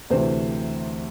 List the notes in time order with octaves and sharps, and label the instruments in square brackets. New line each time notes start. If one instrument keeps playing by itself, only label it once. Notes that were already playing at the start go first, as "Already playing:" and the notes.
[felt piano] D2 C3 E3 C5